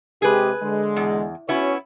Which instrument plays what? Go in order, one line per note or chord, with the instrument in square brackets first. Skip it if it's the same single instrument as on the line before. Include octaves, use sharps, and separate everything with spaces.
[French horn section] C3 G#3 G4 [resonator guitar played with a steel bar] G#4 B4
[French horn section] D3 G#3
[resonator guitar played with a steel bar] E2
[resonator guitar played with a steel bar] B3 E4 [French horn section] C#4 F#4 C#5